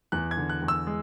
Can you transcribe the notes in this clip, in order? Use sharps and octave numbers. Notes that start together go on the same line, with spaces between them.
E2 F#6
G#6
D3
F#6
E2
E6
G#3